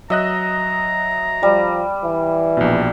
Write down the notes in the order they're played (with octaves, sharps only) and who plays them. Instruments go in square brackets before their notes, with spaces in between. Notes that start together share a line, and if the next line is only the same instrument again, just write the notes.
[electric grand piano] F#3 D#5 F#6 [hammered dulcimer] E5 [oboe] A#5
[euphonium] F3 [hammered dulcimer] G3
[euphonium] E3
[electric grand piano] A#1 B2